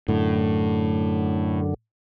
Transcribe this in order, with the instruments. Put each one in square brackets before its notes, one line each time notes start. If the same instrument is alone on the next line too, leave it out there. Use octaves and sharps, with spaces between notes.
[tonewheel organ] F#2 D3 [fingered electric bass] A2